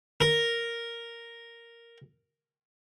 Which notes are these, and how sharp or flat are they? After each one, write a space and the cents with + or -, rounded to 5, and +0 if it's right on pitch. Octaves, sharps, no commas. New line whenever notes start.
A#4 +0